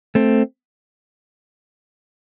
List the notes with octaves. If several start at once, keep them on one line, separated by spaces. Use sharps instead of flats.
A3 C4